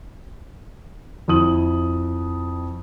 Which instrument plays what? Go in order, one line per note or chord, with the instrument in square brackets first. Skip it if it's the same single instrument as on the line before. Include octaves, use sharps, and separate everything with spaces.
[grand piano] F2 E4 D#6 F#7